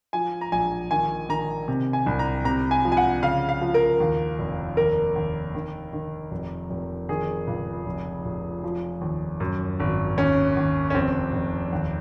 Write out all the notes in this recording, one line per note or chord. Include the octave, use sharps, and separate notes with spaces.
F3 G#5
A#5
A#1 G#5
D#3 G#5
D#3 A#5
C3
G#5
C2
A#5
C3 A#5
G#5
F3
G#5
F#5
C#3 F5
F5
F3
A#4
D#2
F1
D#2 A#4
D#2
D#3
D#3
F1
F1
D#3 G#4
C#2
F1
F1
F3
D#2
F#2
G#1
D#2 C#4
D#2
C#4
F1 C4
F1
D#2